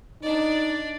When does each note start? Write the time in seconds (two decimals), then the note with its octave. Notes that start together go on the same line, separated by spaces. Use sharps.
0.22 D4 D#4 D5